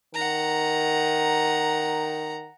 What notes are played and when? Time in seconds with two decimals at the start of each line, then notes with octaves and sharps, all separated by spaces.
0.14 D#3 F#5 A#5